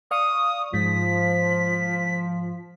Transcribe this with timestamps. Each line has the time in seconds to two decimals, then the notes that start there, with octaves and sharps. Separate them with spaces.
0.11 D5 F5 C#6 D#6
0.74 G#2 F3 B6